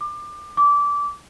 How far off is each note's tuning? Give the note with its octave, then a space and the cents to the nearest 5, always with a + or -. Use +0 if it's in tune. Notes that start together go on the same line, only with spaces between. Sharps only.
D6 +25
D6 -20